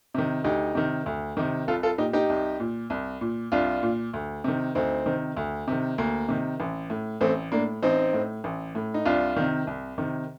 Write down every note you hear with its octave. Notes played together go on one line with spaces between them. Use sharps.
C3 D#3
D2 D#4 G4
C3 D#3
D2
C3 D#3
C2 F4 A4
F4 A4
A#2 D#4 G4
D#4 G4
C2
A#2
C2
A#2
C2 D4 F4
A#2
D2
C3 D#3
D2 C4 D#4
C3 D#3
D2
C3 D#3
D2 A#3
C3 D#3
A1
A2
A1 A3 C4
A2 A#3 D4
A1 C4 D#4
A2
A1
A2
D#4
C2 D4 F4
C3 D#3
C2
C3 D#3